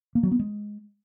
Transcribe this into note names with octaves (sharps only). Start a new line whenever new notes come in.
A#3
F#3
B3
G#3